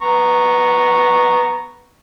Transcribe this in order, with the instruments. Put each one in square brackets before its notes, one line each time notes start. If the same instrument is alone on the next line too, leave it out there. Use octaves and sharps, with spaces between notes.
[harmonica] B3 A#5 C#6